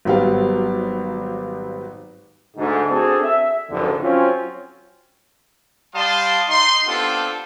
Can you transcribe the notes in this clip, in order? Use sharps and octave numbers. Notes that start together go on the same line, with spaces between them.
G#1 F#3 G3 B3 F5
D2 G#2
C4 D4 F#4 G#4 A4
E5
F#1 F2 G#2 D3
F#3 C4 C#4 F4
G3 D5 F5 A5 C6 D#6
D#4 C6
B3 C4 D4 F4 G4 A4